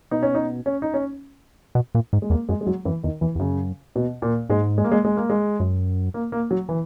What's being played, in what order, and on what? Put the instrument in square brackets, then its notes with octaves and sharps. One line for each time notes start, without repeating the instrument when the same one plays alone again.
[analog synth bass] B2 [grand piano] D#4
[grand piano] C#4
D#4
C#4
D#4
C#4
[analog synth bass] B2
A#2
G#2
[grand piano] G#3
[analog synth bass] E2 [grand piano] A#3
[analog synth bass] F#2 [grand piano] G#3
[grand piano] G#3
[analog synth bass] F#2 [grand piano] F#3
[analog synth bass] F#2 [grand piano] E3
[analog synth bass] E2 [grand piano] D#3
[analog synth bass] E2 [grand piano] E3
[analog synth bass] E2
[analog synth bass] F#2 [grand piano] C#3
[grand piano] B2
A#2
[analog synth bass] G#2 [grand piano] G#3
[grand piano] G#3
A#3
G#3
G#3
A#3
G#3
[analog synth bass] F#2
[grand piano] A#3
A#3
F#3
E3